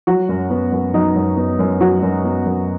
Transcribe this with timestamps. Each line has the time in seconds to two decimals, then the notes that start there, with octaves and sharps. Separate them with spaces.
0.07 F#3 F#4
0.29 F#2
0.50 B3
0.72 F#2
0.94 F#3 D#4
1.16 F#2
1.37 B3
1.59 F#2
1.80 F#3 F#4
2.02 F#2
2.24 B3
2.45 F#2